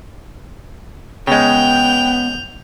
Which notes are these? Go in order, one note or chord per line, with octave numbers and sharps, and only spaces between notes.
C#3 G#3 B3 G5 G6 F7